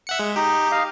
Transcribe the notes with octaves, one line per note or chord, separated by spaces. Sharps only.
E5 F#5 C#7
G#3
D#4 G4
D#5 F5